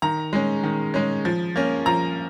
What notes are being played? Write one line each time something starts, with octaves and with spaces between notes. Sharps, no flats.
D#3 A#5
G#3 C#4
D#3
G#3 C#4
F3
A#3 C#4
F3 A#5